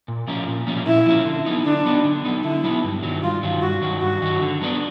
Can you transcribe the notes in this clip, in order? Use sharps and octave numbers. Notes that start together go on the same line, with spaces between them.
A#2
F3 A#3 C#4
A#2
F3 A#3 C#4
A#2 E4
F3 A#3 C#4
D3
F#3 B3 D#4
D3 D4
F#3 B3 D#4
D3
F#3 B3 D#4
D3 E4
F#3 B3 D#4
G2
D#3 F#3
G2 F4
D#3 F#3
G2 F#4
D#3 F#3
G2 F#4
D#3 F#3
D3
F#3 B3 D4